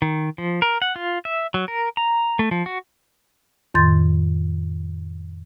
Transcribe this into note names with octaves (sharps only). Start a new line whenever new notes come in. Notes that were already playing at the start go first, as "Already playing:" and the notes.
D#3
F3
A#4
F#5
F4
E5
F#3
A#4
A#5
A3
F3
F#4
F2 A2 D#3 C6 G6 A6